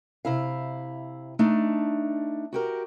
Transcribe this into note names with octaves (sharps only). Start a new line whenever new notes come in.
C3 E4 F5
A3 D4 D#4
F#4 G4 A#4